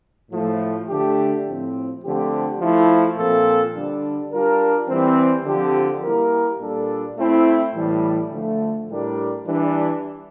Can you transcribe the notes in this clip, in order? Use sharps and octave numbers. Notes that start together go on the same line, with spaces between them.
A2 F3 A3
D3 A3 D4 G4
A2 F3 C4
D3 F3 A3 C4 G4
F3 A3 E4
A#2 F3 C4 F4 A4
D3 G3 D4
G3 D4 F4 A#4
E3 G3 C4
D3 F3 C4 G4
G3 A#3 E4 G4 A#4
A#2 G3 D4 A4
A3 C4 E4
A2 E3 G3
D3 F3 A3
A2 G3 D4 G4 A#4
E3 G3 D4